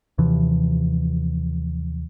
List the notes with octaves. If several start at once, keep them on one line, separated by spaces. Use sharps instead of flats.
D#2 C3 E3 F3